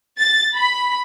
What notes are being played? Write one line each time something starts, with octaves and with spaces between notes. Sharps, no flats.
A6
B5